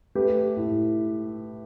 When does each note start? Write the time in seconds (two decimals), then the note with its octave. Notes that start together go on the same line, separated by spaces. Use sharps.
0.15 A3 G4 B4
0.57 A2